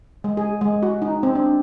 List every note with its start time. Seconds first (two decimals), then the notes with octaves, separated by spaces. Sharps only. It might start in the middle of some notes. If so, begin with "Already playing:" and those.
0.24 G#3
0.37 G#4
0.61 G#3
0.83 F#4
1.02 D#4
1.23 C4
1.35 D4